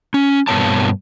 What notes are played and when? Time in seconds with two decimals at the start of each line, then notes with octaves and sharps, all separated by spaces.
0.14 C#4
0.48 G2 B2 A#3 C#5 A5